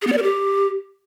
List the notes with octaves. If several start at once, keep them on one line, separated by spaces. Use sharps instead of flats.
G#4
B3
D5
A#4
G4